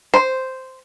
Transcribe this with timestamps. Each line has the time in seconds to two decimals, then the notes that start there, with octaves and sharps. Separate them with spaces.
0.14 C5